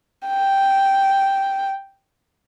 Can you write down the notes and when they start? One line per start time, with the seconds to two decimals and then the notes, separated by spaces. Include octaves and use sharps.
0.28 G5